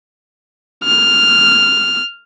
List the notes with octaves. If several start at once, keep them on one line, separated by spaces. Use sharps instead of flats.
F6